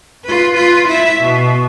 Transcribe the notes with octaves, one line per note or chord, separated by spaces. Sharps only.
F4 B4
F4 B4
E4 E5
B2